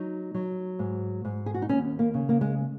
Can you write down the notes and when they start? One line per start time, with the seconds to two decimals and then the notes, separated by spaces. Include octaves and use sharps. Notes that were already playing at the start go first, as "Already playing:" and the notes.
Already playing: F#3 D#4
0.34 F#3
0.79 G#2
1.25 G#2
1.46 G#4
1.54 F#4
1.62 D#4
1.69 D#2 C#4
1.99 A#3
2.14 C#3
2.29 A#3
2.41 G#3